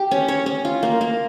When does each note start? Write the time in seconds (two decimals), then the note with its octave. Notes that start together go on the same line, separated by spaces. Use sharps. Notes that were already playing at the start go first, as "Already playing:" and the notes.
Already playing: G4
0.11 C#4
0.28 C#5
0.46 C#4
0.65 F4
0.83 A#3
1.01 A#3